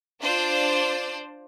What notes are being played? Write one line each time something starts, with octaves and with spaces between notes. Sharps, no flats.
D4 F4 C5 D5